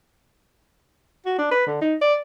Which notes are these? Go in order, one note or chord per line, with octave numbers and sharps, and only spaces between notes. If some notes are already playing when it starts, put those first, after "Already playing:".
F#4
D4
B4
D3
D#4
D5